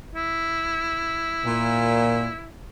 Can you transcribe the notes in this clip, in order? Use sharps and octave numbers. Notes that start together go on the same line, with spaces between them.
E4
A#2